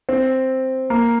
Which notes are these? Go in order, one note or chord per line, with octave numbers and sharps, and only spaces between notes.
C4
A#3